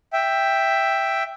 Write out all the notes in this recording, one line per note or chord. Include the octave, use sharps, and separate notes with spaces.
E5 G5